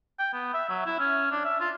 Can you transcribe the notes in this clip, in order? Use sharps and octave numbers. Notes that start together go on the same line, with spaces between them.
G5
B3
E5
F#3
E4
C#4
D4
E5
F4